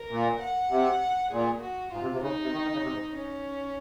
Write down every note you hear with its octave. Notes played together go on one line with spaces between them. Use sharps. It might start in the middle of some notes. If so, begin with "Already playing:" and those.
Already playing: A#4
A#2
F#5
C3
A#2 G#4
F#4
G#2 F4
C3
C3
C#3 D#4
C3
D#3
D#3
C#3
C3
G#2
C#4